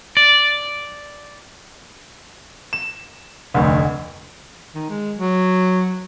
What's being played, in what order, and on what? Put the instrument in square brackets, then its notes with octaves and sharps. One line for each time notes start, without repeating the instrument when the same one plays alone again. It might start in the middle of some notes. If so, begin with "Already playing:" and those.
[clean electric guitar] D5
[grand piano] E7
F1 D2
[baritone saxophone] D#3
G#3
F#3